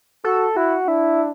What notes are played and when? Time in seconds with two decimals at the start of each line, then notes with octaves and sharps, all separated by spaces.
0.24 F#4 A4
0.56 E4 F#4
0.87 D4 E4